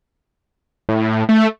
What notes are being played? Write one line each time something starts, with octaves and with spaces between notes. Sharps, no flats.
A2
A3